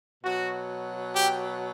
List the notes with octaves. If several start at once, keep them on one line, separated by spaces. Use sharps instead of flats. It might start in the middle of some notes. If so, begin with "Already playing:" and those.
B2 F#3 F#4
G4